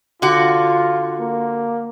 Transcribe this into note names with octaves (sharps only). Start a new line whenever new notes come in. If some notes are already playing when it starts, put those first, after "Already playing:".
D3 F4 F#4
A#3